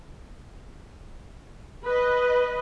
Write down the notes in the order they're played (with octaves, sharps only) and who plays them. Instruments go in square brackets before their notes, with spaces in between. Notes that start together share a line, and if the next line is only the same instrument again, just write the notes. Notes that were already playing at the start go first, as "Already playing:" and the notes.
[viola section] B4 D#5